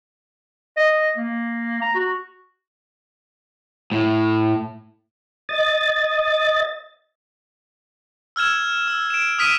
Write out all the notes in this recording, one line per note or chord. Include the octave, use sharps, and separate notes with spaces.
D#5
A#3
A#5
F#4
A2
D#5 A6
E6 F6 G#6 E7
E6
D7 E7
D#6 F6 B6 D7 D#7